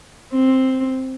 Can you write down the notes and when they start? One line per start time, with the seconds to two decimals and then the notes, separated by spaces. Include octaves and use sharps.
0.33 C4